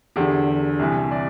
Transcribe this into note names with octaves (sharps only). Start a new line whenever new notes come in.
E2 D3 G4
C2 C3 E3
D5